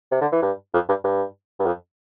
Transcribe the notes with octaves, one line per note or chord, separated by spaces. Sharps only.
C3
D3
E3
G2
F2
G2
G2
G2
F2